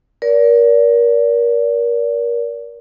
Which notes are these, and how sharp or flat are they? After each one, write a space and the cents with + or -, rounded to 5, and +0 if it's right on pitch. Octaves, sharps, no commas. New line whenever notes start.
A#4 +25 D5 -35